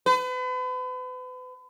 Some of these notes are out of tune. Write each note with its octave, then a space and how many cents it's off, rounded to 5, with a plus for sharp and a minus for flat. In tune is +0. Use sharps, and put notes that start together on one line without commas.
B4 +40